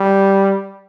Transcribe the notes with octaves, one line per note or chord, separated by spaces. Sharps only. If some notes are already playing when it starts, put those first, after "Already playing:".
Already playing: G3